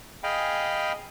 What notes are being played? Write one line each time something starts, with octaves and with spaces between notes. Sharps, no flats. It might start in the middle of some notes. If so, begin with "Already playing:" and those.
G#4 D#5 F5 G5 G#5 B5